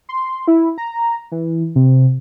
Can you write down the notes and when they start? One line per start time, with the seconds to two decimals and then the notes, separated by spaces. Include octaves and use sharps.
0.09 C6
0.48 E4
0.78 A#5
1.32 E3
1.76 C3